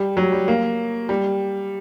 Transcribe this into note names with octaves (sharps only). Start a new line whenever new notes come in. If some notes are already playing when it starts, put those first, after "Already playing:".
Already playing: G3
F#3
G3
A#3
G3